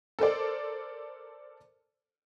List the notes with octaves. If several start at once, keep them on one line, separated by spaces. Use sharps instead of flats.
A4 A#4 C5 D5